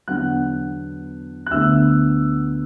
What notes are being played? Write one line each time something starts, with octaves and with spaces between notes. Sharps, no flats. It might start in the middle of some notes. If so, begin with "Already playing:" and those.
E2 D3 F#3 B3 D4 F#5 F#6
F#6
D2 D3 B3 E5 E6